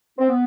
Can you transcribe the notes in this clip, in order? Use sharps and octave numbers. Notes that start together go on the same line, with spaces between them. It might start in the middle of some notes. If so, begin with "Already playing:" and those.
C4
B3